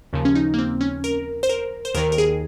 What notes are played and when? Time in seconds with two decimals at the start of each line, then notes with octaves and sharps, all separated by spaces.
0.13 D#2 C#3 F3
0.25 C#4
0.35 D#4
0.54 A#3
0.58 C4
0.81 C#4
1.04 A#4
1.43 C5
1.49 A#4
1.85 C5
1.95 D#2 D#3 A#4
2.12 A#4
2.18 G#4